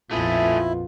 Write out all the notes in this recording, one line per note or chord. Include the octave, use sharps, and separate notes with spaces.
A#1 F2 B2 A3 B3 E4 F4 G#4